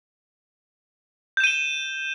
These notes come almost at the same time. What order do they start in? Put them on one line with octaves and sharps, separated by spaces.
G6 E7 D#7 G7